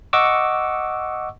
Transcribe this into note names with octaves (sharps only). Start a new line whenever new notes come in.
D#5 F#5 C#6 D6 E6